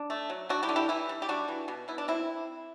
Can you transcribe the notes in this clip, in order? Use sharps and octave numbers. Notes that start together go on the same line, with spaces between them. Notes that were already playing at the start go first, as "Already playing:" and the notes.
Already playing: D4
A3
F#3
F#3 D4 F#4
E4 G4
D3
E4 G4
E3 E4
G3
G4
G3 D4 F#4
E3
B2
B2 E4
D4
C4 E4